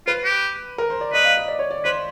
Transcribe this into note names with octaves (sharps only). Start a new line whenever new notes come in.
F4 B4
G4
A#4
C5
D5
B4 D#5
F5
D#5
D5
C#5
D5
B4 C5